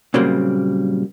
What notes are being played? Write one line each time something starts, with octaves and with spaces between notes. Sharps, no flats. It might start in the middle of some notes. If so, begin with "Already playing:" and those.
A#2 C#3 F#3 G3 A#3 C4